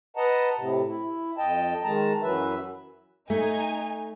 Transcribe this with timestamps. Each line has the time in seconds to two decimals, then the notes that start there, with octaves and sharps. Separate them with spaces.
0.17 B4 D#5 F#5 A5 A#5
0.57 A2 C3
0.87 E4
1.38 F2 D#5 G5 A5
1.84 D#3 G#3 A5 A#5
2.22 F#2 E3 F#3 B4 E5
3.30 A3 D#4 G#5